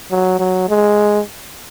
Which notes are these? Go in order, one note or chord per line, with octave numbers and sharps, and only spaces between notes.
F#3
F#3
G#3